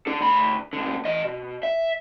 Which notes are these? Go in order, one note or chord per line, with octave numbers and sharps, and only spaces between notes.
D4 A4
D2 B5
B1 D3
E3 D#5
B2
E5